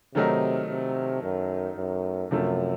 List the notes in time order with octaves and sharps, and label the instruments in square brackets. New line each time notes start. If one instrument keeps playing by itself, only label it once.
[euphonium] C3 [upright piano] D#3 F#3 A3 D#4 A#4
[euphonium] C3
F#2
F#2
[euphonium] F#2 [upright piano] C3 F3 A3